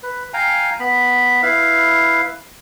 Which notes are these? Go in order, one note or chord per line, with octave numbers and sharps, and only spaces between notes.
B4
F5 G5 G#5 A#5
B3 B5
E4 B4 F5